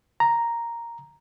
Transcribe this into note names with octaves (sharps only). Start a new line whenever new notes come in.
A#5